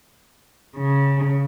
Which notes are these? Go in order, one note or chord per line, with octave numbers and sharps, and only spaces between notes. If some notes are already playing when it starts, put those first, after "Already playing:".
C#3